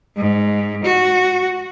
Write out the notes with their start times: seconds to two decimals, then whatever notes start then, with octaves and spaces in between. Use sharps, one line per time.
0.16 G#2
0.84 F#4